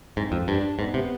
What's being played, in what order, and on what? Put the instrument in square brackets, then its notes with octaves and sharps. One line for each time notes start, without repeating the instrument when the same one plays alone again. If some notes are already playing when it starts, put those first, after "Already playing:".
[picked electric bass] G#2 [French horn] C4
[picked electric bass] F2
[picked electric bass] G2 [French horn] D4
[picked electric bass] G#2 [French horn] B3
[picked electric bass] C3